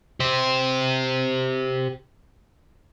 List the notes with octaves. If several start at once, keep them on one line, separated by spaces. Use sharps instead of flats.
G4 C5